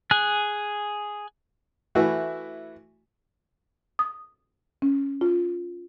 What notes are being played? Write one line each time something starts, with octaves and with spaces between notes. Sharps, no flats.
G#4 G#5 F#6
E3 A3 E4 F#4
D#6
C#4
F4